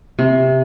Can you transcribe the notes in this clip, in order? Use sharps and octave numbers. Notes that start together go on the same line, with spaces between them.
C3